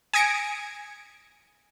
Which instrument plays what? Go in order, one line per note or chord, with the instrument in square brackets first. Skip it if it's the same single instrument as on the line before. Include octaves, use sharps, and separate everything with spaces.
[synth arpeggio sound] G#5 D#6 G#6 A#6 C#7 D7